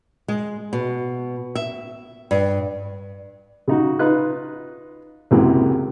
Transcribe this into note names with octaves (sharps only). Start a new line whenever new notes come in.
G#3
B2
E5
G2
C#3 D#4 F#4
D#4 F4 B4 F#6
C#2 F#2 C3 E3 G#3 A#3